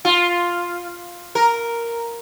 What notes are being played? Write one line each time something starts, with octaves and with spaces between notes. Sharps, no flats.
F4
A#4